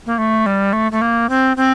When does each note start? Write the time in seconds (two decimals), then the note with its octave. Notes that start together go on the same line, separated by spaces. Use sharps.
0.06 A#3
0.18 A3
0.46 G3
0.73 A3
0.92 A3
1.01 A#3
1.29 C4
1.57 C4